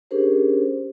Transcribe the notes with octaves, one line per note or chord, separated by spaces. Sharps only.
C#4 D4 G4 G#4 A#4 C5